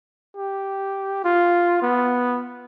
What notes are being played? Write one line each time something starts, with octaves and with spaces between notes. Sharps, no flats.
G4
F4
B3